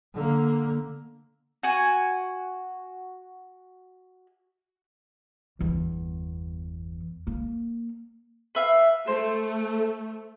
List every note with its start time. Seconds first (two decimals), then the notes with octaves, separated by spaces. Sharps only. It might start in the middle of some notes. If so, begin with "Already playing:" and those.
0.14 D3 A#3
1.63 F#4 G#5
5.59 G1 E2
7.27 A#3
8.55 B4 E5 F5
9.07 A3 C5